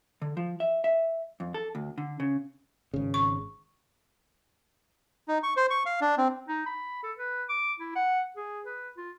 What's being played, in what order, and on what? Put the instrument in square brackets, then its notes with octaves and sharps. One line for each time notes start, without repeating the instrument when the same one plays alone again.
[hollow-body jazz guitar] D3
F3
E5
E5
F2
A4
D2
D3
C#3
[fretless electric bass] G#1 C#3
[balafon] C#6
[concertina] D#4
C#6
C5
C#6
F5
D4
C4
[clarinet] D#4
B5
A4
B4
D6
E4
F#5
G#4
B4
F4